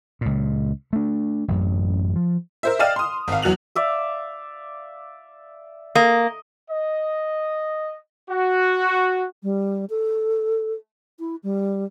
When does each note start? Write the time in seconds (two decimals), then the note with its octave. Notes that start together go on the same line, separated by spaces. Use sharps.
0.21 C#2 A#2
0.93 A3 D4
1.48 A1 F#2
2.16 F3
2.63 A#4 C5 E5
2.79 D5 D#5 F5 G5 F6 E7
2.96 C6 D#6
3.28 G#1 F5
3.42 E2 F#3 F#6 F7 F#7
3.75 D5 E5 F5
5.95 A#3 D#5
6.70 D#5
8.29 F#4
9.43 G3
9.90 A4
11.19 E4
11.43 G3